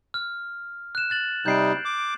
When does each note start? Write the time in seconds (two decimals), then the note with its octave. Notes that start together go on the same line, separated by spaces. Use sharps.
0.14 F6
0.95 F#6 E7
1.10 F#6 A6 F#7
1.46 C3 G3 D#4 G6 C7 D7
1.85 D6